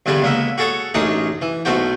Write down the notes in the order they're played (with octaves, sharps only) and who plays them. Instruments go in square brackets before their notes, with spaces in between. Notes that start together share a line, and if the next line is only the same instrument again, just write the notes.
[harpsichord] E2 G2 D3 G3 G#5 B5
C#2 A#3 B3 E5
F#4 G#4 A4 C#5 F#5
A1 F#2 D4 D#4 G#4 D#5
E3
B1 B2 A3 F#4 C5 G5